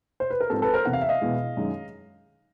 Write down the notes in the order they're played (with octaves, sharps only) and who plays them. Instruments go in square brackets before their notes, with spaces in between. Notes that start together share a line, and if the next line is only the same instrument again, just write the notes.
[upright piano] C5
B4
A#4
G#2 F3 G#3 C4 A4
A4 B4
A#4 C5
E2 C3 E3 F#5
F5
E5
D#5 F5
E2 B2 G#3 B3
F#2 D#3 G#3